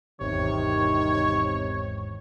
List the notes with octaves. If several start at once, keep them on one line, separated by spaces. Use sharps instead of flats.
G#1 E2 C3 D#3 C#5